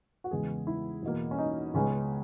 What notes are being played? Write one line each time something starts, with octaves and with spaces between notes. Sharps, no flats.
F#4
E2 C#3 G#3 B3 G#4
E4
E2 B2 A#3
C#4
D#4
C#2 C#3 G#3 B3 C#4